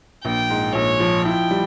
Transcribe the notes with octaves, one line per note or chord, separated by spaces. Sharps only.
A#1 G5
G#2
A#1 C#5
F3
E4 G5
G3